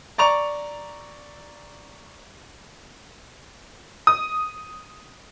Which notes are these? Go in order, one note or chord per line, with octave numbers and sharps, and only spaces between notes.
D5 A#5 C#6 F7
D#6